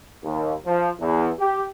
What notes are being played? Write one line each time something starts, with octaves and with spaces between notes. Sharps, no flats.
D#2
F3
E2
G4